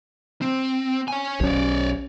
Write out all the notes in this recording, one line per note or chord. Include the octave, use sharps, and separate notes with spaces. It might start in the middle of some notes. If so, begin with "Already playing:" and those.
C4
C#5 G#5
B1 C#4 C#5 D5